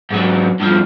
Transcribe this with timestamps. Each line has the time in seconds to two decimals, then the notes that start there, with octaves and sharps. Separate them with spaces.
0.11 G#2 F#3
0.60 G2 F3